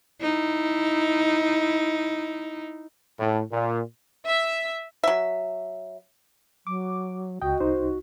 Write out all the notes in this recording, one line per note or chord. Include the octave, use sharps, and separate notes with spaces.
D#4 E4
A2
A#2
E5
F#3 E5
F#3 D6
C#2 F#4 D#5 G5
C2 D#4 C5